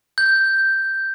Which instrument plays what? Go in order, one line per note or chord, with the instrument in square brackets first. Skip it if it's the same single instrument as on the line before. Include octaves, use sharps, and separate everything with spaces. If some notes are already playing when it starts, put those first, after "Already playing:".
[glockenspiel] G6